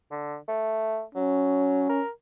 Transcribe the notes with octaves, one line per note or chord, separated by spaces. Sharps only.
D3
A3
F#3 C#4
A#4